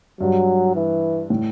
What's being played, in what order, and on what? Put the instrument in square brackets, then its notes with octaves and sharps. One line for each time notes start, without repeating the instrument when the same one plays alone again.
[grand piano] G2 [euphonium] F#3
[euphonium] E3
[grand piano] A2